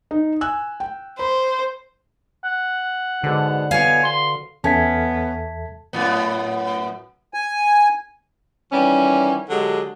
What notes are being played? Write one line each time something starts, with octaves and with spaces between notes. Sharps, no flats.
D#4
G#5 E6 F#6
G5
C5 B5
F#5
G#2 B2 D3
B2 F#4 B4 C#5 F5 G#5
C6
E2 B3 C#4 A4 E5 A5 G#6 B6
F#2 A2 B3
G#5
D#3 E3 G3 C#4
D3 F#3 G#3 G4 A4